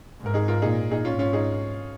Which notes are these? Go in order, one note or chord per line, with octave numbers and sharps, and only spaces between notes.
G#2
A#4
D#4 G#4
F4 A#4
A#2 D#4 G#4
D#4 G#4
G#2 C#4 F4
C#4 F4
D#4 G#4